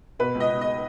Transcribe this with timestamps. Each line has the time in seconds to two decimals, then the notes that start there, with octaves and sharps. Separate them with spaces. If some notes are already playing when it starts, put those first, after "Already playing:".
0.19 B2 B4
0.35 C#2
0.40 D#5
0.51 B2
0.61 D#5